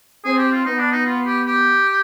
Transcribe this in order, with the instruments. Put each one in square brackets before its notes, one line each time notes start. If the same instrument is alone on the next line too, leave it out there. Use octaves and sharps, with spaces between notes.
[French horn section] C4 [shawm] G#4
[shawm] G4
F4
[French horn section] B3 [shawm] D#4
[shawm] D4
D#4
F4
G4
G4